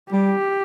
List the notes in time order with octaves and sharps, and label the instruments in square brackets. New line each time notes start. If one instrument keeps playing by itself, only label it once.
[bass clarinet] G3 [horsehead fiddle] G4